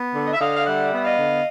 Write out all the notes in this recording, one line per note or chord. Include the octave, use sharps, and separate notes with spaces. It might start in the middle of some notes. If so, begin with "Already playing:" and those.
Already playing: B3
D3
D#5
E5
D3 D#5 F5
F5
G3 E5 F#5
B3 F#5
D#5 F5
D3